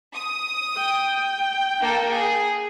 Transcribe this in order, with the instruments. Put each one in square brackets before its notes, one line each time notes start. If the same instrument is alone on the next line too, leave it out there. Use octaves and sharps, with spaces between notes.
[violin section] D#6
[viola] G5
[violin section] A#3 A4
G#4